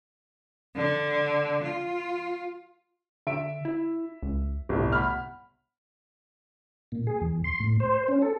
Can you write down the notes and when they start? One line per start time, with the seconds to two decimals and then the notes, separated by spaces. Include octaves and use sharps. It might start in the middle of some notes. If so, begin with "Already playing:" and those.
0.75 D3
1.62 F4
3.27 D3 E5 D7
3.65 E4
4.22 C#2
4.69 G1 C2 A2
4.92 F#5 B5 F6
6.92 A#2
7.07 G#4
7.21 E2
7.44 C6
7.60 A2
7.80 C5
8.08 C#4
8.22 A4